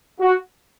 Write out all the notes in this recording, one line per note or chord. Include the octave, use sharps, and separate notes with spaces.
F#4